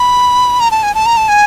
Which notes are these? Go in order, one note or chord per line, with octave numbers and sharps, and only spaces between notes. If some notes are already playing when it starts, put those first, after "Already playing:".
Already playing: B5
A#5
A5
G#5
A5
A#5
A5
G#5